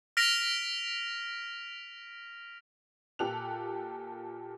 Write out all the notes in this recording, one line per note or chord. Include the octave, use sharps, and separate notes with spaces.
F6 A#6 B6 D7 F7
A#2 F4 G4 A4 F#6 F7